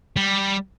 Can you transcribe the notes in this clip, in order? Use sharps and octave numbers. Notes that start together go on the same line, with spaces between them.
G3